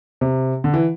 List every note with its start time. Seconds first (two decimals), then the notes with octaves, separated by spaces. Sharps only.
0.21 C3
0.64 D3
0.74 E3